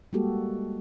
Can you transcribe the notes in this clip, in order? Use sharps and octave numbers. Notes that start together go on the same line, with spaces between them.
G3 G#3 A#3 F#4 G4 A4